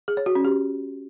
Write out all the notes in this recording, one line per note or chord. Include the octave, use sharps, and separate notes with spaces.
G#4
C#5
F#4
C#4
G4